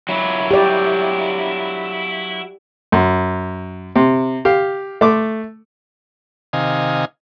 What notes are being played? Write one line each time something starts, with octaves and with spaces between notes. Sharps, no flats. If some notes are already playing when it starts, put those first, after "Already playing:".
F#3 E4
G4 D5
F#2
C3
G4 F5
A3 D6
C3 D#3 D#5 F5 G#5